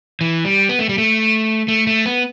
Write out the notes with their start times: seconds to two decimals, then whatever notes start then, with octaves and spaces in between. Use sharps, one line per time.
0.21 E3
0.45 G3
0.69 B3
0.79 A3
0.89 G3
0.98 A3
1.68 A3
1.87 A3
2.06 B3